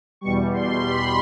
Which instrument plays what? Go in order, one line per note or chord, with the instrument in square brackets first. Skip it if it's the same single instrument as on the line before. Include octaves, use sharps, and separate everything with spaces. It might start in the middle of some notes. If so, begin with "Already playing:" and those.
[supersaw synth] E2 B2 G3 C#6
C6
B5